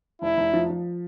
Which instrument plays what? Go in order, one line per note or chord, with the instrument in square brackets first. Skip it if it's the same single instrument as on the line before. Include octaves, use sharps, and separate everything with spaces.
[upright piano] F1 [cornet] E4
[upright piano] F1
F3
F3